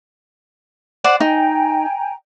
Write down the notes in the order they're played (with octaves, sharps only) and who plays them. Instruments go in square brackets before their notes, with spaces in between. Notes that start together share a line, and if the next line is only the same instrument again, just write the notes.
[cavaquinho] C5 D5 F#5
[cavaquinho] D#4 [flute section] G5 G#5 A#5